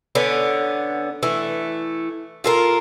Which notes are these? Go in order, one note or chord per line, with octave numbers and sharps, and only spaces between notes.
D3 B3 C#4
E3 A3
F4 A4 A#4